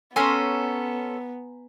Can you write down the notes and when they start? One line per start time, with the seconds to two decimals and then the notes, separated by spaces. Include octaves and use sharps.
0.16 B3 C#4 A4 G#5 A#5 C6